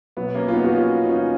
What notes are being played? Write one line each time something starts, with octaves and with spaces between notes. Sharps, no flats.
B2 F#3 B3
A#3 C#4
F4
B3 D#4
F#4
C#4 F4
D#4
C#4 F4